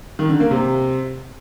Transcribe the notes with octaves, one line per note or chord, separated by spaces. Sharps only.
D#3
D3
A#3
C3